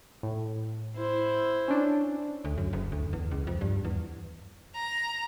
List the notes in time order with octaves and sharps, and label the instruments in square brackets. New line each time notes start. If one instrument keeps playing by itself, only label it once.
[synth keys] A2
[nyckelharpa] E4 C5
[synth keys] C#4 D4
[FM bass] D2
F#2
F#1
D2
E2
C#2
F2
G2
E2
[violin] A#5